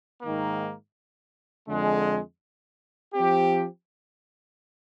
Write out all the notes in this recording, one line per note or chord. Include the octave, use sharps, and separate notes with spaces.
G#2 D#3 A#3
F2 D3 G#3
F3 C4 G4